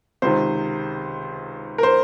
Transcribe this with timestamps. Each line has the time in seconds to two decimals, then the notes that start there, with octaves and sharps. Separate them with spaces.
0.22 C#2 C3 D#3 C5
1.78 A#4
1.83 C5